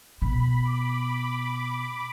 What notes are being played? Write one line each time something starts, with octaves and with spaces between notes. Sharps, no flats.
B2 B5
D6